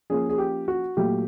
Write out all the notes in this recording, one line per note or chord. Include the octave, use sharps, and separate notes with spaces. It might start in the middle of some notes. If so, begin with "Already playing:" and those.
F3 A#3 C#4 G#4
G#4
G4
F#4
A#2 F#3 A3 G4